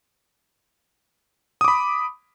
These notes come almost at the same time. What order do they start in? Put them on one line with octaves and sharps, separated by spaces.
D#6 D6 B5